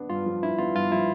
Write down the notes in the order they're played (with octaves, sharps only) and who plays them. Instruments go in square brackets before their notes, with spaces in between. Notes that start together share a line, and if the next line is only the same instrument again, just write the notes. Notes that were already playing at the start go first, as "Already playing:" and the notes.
Already playing: [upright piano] B3 D4
[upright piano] G2 [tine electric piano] F4
[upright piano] F3
[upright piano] D4 [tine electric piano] E4
[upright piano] B3 [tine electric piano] F4
[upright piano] G2 [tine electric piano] F4
[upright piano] F3 [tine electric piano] E4